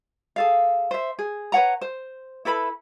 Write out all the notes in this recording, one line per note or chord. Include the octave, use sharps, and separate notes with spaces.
G#4 A4 F5
C5 E5
G#4
B4 C#5 F#5 A#5
C5
E4 A4 B4 B5